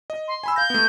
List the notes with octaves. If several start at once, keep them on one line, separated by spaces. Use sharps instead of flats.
D#5
C6
G#5 B5 E6
F5 G6 A#6
A3 B3